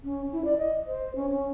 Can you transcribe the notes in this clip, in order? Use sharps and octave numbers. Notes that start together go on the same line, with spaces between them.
C#4
E4
D5
D#5
C5
C#4
C#4